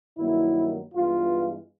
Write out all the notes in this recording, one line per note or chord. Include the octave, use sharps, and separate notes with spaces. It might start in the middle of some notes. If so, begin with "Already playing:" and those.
G2 D#3 F#3 A#3 E4
G2 E3 G#3 B3 F4